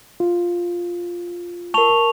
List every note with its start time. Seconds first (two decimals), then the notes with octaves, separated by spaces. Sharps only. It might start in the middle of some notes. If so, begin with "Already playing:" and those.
0.20 F4
1.74 A#4 A5 C#6 F7